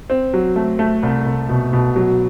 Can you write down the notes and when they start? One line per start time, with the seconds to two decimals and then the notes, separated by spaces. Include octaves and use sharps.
0.10 C4
0.34 F#3
0.56 A3
0.79 A3
1.03 C2
1.26 C2
1.49 B2
1.73 B2
1.96 F#3